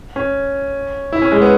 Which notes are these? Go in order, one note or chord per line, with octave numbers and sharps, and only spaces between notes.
C#4
E4
C#4
G#3
B3